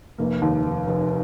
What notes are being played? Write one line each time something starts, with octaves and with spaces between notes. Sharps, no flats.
F1 A#3
D#2
F1
F1